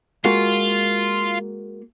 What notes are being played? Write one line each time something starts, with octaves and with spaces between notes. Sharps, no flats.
G#3 A#3 F4 F#4